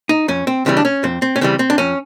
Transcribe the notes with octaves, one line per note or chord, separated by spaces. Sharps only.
D#4
F2 C#4
C4
C#3 E3 G3 C4
D4
C#4
F2 C4
C4
C#4
C#3 E3 G3 C4
C4
D4
F2 C#4